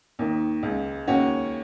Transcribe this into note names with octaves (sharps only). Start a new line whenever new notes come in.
D#2 D#3
C#2 C#3
D#2 C#3 C#4 F#4